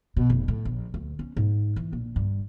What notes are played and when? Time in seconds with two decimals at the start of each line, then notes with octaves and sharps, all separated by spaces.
0.16 B2
0.30 F1
0.48 A2
0.65 A#1
0.94 D2
1.19 C#4
1.37 G#2
1.76 E3
1.93 A#1
2.16 G2